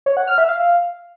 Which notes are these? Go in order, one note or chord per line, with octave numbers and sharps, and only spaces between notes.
C#5
F#5
F6
E5
F5